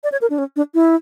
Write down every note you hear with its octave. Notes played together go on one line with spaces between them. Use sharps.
D5
C#5
A#4
D4
C#4
D4
E4